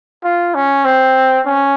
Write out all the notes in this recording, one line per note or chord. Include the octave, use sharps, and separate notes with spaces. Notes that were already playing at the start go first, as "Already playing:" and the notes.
F4
C#4
C4
C#4